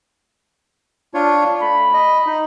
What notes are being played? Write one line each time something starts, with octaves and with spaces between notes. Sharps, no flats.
D4 F4 C#5
A3 B5
D#5
D#4